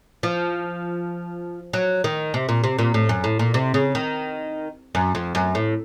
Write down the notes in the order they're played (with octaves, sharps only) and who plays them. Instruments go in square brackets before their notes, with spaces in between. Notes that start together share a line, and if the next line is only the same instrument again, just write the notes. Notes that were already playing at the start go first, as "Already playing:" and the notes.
[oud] F3
F#3
D#3
C3
A#2
C3
A#2
A2
F#2
A2
A#2
C3
C#3
D#3
F#2
F2
F#2
A2